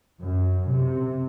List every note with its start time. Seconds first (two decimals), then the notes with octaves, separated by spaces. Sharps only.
0.20 F#2
0.68 C3